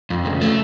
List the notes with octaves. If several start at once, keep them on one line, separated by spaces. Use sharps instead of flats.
F2
C#3
A3